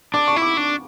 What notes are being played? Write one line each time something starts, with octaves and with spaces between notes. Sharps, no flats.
D4 D6
C#6
E4
D6
D4